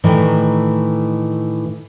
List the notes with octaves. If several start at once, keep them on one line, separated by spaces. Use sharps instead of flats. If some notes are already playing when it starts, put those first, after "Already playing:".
A2 D#3 E3 A3 D5 A#5